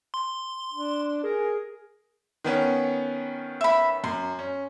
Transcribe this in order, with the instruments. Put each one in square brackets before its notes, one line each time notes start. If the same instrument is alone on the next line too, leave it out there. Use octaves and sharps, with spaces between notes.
[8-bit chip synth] C6
[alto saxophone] D4
[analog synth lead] G#4 [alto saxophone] A#4
[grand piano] D#3 B3 C#4
[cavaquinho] E5 B5
[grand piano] F#2 [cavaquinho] C6
[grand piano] C#4